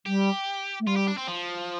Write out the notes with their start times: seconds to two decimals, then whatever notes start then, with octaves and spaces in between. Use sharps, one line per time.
0.06 G3 G4
0.80 A3
0.87 G3 F4
0.96 G4
1.07 D4
1.17 C4
1.27 F3